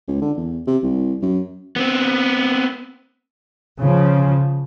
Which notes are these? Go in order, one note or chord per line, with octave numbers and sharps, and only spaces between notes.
C#2
D3
E2
C3
C2
F#2
B3 C4
C#3 F3